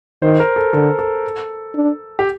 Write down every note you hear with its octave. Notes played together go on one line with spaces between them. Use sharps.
D#3 C5
A#4
A4
D3 A4
A4
D4
G4